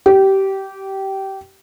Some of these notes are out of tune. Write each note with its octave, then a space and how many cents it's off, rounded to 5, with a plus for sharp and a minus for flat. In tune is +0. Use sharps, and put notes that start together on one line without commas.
G4 -20